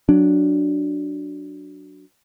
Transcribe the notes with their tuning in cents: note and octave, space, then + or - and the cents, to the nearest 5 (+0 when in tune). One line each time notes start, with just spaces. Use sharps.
F#3 +0 D4 +0